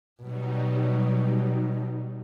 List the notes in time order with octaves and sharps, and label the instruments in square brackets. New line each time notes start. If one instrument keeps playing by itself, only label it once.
[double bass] B2 [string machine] F#3 G3 D#4